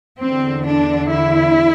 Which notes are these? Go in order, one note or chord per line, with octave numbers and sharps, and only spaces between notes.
E2 D3 C4
D4
E4